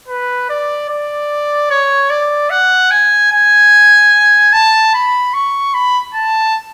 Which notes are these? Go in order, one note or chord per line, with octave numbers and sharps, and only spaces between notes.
B4
D5
D5
C#5
D5
F#5
G#5
G#5
A5
B5
C#6
B5
A5